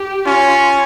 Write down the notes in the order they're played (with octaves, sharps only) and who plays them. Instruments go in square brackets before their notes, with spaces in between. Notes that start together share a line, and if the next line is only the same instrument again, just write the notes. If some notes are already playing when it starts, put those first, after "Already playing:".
Already playing: [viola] G4
[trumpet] C#4 [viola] F4